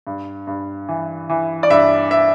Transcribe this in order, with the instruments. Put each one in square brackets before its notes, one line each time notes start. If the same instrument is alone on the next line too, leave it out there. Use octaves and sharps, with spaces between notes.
[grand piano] G2
G2
E3
E3
D5
G2 E5
E5